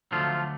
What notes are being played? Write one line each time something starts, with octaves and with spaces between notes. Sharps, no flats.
D2 D3 F3 F#3 A3 F4